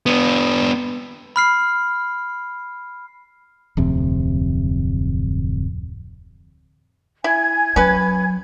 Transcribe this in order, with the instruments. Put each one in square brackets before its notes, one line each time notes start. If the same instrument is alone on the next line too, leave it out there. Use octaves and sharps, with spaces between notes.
[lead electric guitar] B3 D4
[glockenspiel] B5 F6 C7
[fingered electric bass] D1 F2 C3
[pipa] E4 [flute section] G#5 G#6
[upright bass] F#3 [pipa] C#4 B4